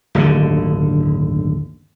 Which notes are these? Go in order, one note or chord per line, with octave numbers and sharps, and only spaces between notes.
D1 G1 D#2 D3